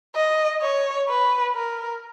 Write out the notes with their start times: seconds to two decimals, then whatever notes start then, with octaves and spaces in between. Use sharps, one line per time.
0.15 D#5
0.62 C#5
1.09 B4
1.55 A#4